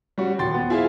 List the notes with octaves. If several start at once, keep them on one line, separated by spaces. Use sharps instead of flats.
G3 C#4 F#4
D#1 G5 C6 A6
B3
E4 F4 G#4 C5 E5 F5